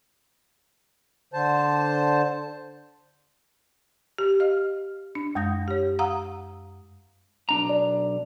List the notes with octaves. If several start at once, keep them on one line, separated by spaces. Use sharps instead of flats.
D3 C5 A5
G4
G4 D#5 F5 F6
D4
F#2 G#3 D#6 G6 A#6
G4 C#5
F5 F#5 A#5 D#6 E6
B1 D4 A#5
D5